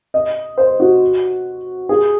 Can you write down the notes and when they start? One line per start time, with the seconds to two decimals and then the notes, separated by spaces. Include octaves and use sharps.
0.14 D#5
0.58 C5
0.80 F#4
1.89 G#4